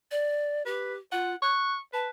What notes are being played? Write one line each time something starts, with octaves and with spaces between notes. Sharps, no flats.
D5
G4 B4
F4 F#5
C#6 F#6
B4 A5